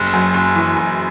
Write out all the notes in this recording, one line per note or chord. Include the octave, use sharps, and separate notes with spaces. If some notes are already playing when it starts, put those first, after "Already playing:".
Already playing: F#1
F#2
F#1
E3
F#1